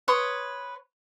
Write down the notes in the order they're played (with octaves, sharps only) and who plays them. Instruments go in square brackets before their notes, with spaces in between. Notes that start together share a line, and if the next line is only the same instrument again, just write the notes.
[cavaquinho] B4 C#5 C6 D#6